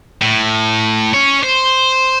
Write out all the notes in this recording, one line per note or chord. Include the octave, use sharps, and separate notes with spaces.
A2
C#4 C#5
C5